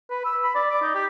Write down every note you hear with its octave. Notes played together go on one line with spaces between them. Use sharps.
B4
E6
B5
D5
D6
D#4
G4